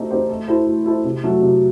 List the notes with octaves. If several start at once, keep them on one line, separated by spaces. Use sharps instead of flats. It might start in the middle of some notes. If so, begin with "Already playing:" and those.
Already playing: A3 C4 D#4 G4
C4 D#4 G4 C5
A3
E4 A4 C5
A3
E4 A4 C5
C3
F#3 A3
C3